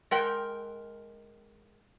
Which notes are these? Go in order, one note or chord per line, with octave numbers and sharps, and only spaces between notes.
G#3 A#4 G5